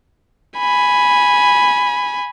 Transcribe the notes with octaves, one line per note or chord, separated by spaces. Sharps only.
G#5 B5